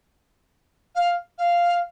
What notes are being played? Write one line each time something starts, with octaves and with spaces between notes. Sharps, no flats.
F5
F5